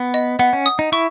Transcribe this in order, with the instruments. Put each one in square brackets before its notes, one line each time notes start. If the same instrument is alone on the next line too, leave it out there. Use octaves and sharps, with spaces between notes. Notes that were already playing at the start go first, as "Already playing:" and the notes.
Already playing: [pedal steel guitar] B3
[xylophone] D#5
[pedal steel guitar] B3 [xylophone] F#5
[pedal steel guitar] C#4
[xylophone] D#6
[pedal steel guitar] D#4
[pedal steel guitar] E4 [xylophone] C#6